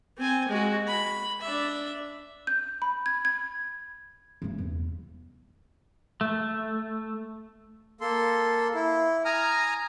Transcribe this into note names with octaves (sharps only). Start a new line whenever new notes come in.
C4 G#5
G#3 F#4
B5
D4 E5
G6
B5
G#6
G#6
C#3 A3
E2
A3
A#3 A4 C6
E4
G#5 A#5 D#6 F6